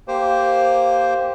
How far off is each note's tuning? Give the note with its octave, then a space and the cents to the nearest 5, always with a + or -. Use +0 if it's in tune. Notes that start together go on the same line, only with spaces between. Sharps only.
A#3 +0 G4 +0 C5 +0